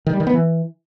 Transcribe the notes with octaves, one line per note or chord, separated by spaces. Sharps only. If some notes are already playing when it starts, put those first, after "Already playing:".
D#3
G3
D#3
B3
E3